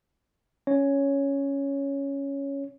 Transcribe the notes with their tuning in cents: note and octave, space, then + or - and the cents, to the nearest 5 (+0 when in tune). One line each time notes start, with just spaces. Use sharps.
C#4 +0 C#5 +5